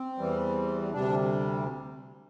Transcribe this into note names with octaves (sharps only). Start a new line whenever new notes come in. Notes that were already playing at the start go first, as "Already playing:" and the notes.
Already playing: C4
E2 E3 G3
D2 C3 G3 D4